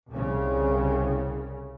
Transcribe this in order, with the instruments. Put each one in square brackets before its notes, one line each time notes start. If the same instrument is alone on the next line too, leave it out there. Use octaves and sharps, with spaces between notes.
[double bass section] C2 C#3